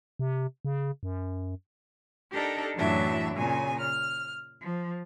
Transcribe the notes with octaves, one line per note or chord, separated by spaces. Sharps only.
C3
C#3
F#2
D4 D#4 G4 A4 A#4
F#2 A2 E3 F#3 D4 E5
A#2 C#3 G#5
F6
F3